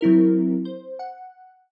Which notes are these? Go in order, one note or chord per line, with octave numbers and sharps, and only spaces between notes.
F#3 C4 E4 A#4
C5
F#5